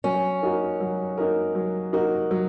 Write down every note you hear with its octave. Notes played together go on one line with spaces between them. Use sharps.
F#3 C#4
A#3 D#4 F#4 A#4
F#3
A#3 D#4 F#4 A#4
F#3
A#3 D#4 F#4 A#4
F#3